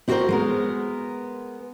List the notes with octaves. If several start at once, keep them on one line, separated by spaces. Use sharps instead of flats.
C4 E4 F#4 A4 A#4 C5
G#3 B3 A#4